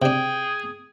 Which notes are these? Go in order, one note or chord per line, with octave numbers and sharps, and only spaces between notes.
C3 D4 G#4 G5